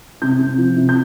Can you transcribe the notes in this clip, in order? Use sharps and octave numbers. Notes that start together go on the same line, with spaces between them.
C3 G6
C3
F3
C3
G6